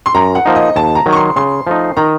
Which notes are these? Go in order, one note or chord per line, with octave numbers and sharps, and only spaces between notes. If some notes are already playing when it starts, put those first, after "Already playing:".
C6
F#2 A#5
F#5
F3 A#3 D#4
D#5
D#2 A5
A#5
D#3 F#3
C#6
C6
C#3 C6
F3 A3 D#4
D#3 A#5